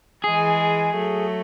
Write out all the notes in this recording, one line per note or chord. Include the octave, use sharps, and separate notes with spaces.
E3 G#3 G#4
F#3 A3